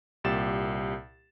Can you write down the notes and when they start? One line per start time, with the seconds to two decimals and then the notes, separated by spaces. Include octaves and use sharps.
0.24 C2 A#2 G4 A6 E7